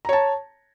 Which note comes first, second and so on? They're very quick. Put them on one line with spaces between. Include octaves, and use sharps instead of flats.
A#5 C#5 A5